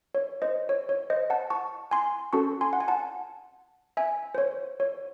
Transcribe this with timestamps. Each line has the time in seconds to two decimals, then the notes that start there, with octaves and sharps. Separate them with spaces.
0.15 C#5
0.42 C5 D#5
0.69 C#5
0.89 C#5
1.10 C5 D#5
1.30 F#5 A5
1.50 A5 C#6
1.91 G#5 C6
2.33 C#4 F#4 A4 A5 C#6
2.61 G#5 C6
2.73 F#5
2.80 G#5
2.88 F#5 A5
3.97 E5 G#5
4.35 C5
4.38 C#5
4.80 C#5